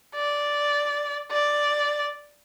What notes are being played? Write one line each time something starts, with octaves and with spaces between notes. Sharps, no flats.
D5
D5